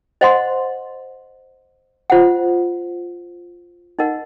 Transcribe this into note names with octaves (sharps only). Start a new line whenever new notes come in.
C5 D#5 F#5 C6
F4 C5 F#5
D#4 A#4 D#5 F#5